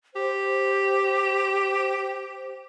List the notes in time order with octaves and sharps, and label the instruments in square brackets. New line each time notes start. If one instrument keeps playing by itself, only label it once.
[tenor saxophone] G4 [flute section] C5